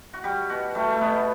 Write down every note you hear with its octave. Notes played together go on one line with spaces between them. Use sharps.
F#4
G3 G4
B2 F#4
G3 A3
A3
B2 B3